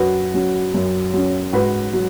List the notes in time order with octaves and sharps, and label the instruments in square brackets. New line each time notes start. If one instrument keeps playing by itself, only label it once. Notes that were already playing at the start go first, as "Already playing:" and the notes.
Already playing: [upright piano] F#2 F#4 B4
F#3 C#4
F#2
F#3 C#4
G#2 F#4 B4
F#3